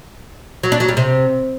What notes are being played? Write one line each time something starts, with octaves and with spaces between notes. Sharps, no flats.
F#3
D4
F#3
G3
C3